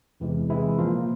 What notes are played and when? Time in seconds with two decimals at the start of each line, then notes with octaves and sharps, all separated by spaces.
0.20 E2 C3 E3 G#3
0.49 C3 E3 G#3 E4
0.78 A#2 F3 A#3 F4